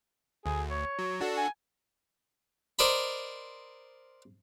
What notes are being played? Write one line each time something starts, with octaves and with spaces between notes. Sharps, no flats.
D2 G#4
C#5
F#3
D4 F#4 A4
G#5
A#4 C5 D5 D#5 A#5 B5